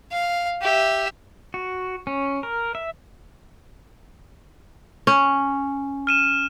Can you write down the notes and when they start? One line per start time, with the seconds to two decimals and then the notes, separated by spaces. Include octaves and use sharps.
0.12 F5
0.61 G4 E5
1.54 F#4
2.07 C#4
2.43 A#4
2.75 E5
5.07 C#4
6.07 F6 D#7 E7